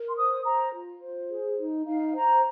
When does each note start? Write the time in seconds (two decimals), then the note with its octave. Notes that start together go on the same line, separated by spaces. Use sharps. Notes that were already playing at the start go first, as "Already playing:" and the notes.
Already playing: A#4
0.09 C6
0.16 C5 D#6
0.44 C5 A#5
0.73 F4
1.02 C5
1.29 G#4
1.58 D#4
1.86 D#4 F5
2.14 C5 A#5